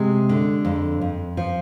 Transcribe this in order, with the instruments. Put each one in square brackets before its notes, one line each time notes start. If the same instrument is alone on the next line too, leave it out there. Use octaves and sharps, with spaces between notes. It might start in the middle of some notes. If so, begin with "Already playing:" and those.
Already playing: [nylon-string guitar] C3 G#3
D3
F2
F2
F3